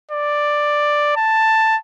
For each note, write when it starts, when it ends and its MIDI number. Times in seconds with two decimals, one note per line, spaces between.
0.11 1.12 74
1.16 1.77 81